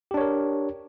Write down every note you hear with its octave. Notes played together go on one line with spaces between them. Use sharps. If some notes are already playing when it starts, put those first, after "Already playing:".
D4 G4 A#4 C#5